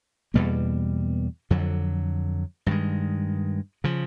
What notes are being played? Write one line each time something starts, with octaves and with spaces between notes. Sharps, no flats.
E2 B2 G3 A#3
F2 D3 F#3
G2 D#3 G#3
C#3 F3